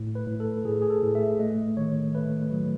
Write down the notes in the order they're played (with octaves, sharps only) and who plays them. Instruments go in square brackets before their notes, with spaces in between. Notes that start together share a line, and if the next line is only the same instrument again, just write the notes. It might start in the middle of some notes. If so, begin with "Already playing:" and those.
Already playing: [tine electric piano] A2
B4
A2
A4
A2 G#4
G#4
A4
A2
E5
A3 D#5
D#3 C#5
A3 B4
F#3